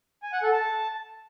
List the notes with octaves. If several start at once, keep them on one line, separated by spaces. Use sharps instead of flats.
G#5
F#5
A4
A5